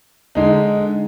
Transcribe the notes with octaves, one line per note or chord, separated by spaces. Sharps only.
D3 G#3 D#4